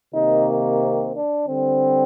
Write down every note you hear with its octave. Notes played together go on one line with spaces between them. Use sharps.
C3 D#3 A#3 D#4
C4
D4
D3 G3 C4